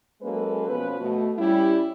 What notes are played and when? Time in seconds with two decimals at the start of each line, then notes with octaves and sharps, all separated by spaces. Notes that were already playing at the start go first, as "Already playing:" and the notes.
0.22 F#3 G#3 A#3 C#4 A4 B4
0.68 B2 F3 B3 C#4 B4
1.00 B2 A3
1.38 G3 C#4 E4